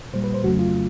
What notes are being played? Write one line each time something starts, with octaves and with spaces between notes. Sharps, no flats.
A#2 G3 C5
B4
C5
F2 C#3 F#3 A3 F#4
F4